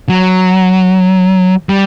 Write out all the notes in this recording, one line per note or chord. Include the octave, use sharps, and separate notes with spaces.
F#3
G3